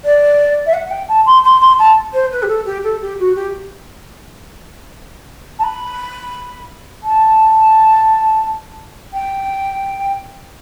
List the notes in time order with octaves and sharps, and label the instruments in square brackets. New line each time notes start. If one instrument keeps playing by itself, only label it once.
[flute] D5
E5
F#5
F#5
G5
A5
C6
C6
C6
A5
C5
B4
G4
A4
G4
A4
G4
F#4
G4
A5
B5
A5
G5